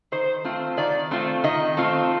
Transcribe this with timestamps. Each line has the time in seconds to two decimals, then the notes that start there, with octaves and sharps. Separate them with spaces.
0.12 D#3 C5
0.44 A3 C4 F4
0.77 D#3 D5
1.11 A3 C4 F4
1.44 D#3 D#5
1.77 A3 C4 F4